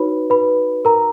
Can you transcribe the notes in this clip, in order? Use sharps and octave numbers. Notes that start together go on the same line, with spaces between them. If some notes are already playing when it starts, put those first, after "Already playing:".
Already playing: D#4 F#4 B4 C#5 B5
B4 B5
A#4 A#5